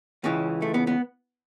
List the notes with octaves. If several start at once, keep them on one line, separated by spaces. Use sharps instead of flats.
C#2 C#3 E3 C#4
A3
B3
B3